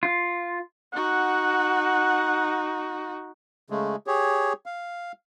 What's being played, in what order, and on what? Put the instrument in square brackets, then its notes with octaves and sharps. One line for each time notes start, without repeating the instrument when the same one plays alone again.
[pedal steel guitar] F4
[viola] D#4 F#4 [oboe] F#5
[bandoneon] C#3 G#3 A3
G4 G#4 C#5
F5